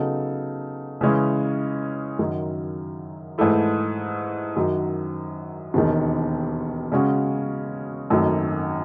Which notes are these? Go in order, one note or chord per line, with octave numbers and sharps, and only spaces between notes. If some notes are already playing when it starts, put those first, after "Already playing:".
Already playing: C#3 F#3 B3 D#4 A4
C#3 E3 G#3 C#4 E4
F#2 D#3 F#3
G#2 E3 A3 E4
F#2 D#3 F#3
E1 D#2 D#3
C#3 G#3 C#4 F#4
G#1 F#2 D#3 F#3 A3